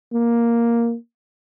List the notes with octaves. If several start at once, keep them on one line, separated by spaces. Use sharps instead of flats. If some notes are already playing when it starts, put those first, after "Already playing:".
A#3